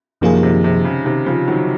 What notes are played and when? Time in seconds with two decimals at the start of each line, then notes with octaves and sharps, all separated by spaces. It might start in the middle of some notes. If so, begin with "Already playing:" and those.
0.21 F#2 C3 D#3 F3 A#3 F4 G#4
0.43 C3 D#3
0.64 C3
0.84 C#3
1.05 C3 D#3
1.26 C#3 F3
1.48 D#3 F#3